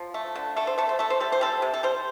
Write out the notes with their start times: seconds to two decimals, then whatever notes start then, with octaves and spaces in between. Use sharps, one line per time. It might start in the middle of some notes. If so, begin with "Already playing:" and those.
Already playing: F3
0.14 A3
0.35 D3
0.56 A3 A4
0.67 C5
0.78 A3 A4
0.89 C5
0.99 A3 A4
1.10 C5
1.20 G3 A4
1.32 C5
1.41 G3 A4
1.62 C3
1.74 A4
1.83 G3 C5